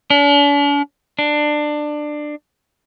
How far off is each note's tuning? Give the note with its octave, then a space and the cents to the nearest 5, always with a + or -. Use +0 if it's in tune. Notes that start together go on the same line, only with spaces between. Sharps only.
D4 -45
D4 +20